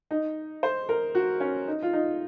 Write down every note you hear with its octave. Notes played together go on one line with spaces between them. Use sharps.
D#4
C5
A#4
F#4
C#4
D#4
F4
D#4